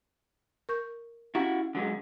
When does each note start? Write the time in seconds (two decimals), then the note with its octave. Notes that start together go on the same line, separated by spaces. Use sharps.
0.69 A#4 C#6 G6
1.35 C#4 E4 F#4 G4 A#5
1.75 D3 F#3 G#3